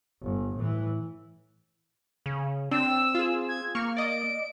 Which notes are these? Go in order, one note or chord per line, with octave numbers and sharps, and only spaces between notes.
G1
A2 E3
C#3
C4 D4 E6
F4 G#4
G#6
A#3 C#6 F6
D5 D#5 D7